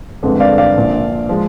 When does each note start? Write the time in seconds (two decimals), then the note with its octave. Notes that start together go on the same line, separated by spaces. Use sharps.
0.22 G1 F2 D3 G#3 C4
0.40 D5 F5
0.58 D5 F5
0.76 A#1 A#2 F3
1.29 F3 G#3